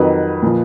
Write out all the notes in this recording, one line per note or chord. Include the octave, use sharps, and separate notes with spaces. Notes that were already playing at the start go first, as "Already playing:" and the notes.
Already playing: F2 D#3 F#3 B4
A#2 F3